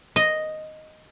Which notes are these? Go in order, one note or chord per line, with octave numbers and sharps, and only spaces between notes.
D#5